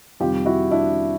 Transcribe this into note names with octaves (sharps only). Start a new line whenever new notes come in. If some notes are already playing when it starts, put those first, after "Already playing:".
F2 C3 D#3 G3 F4 G4
E4 F#4
D4 E4